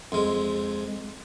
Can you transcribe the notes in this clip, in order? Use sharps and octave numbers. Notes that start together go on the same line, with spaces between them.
F2 G#3